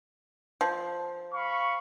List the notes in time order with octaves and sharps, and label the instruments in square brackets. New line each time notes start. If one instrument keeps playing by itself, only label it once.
[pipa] F3
[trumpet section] F5 B5 C#6